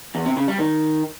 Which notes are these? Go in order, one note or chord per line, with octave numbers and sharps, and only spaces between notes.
E2
C3
C#3
G3
D#3